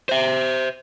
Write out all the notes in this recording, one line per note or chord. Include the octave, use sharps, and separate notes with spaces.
C5 E5